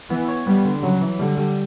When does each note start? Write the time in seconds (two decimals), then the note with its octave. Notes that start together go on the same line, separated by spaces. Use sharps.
0.10 E3 B3
0.28 C#5
0.47 G3 B3
0.65 D3
0.83 C#3 F#3
1.01 E3
1.19 D3 G3
1.37 G3